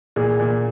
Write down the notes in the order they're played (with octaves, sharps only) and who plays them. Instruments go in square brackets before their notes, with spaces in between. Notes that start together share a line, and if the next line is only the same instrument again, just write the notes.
[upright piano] A#2 [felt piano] G#4
[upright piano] A#2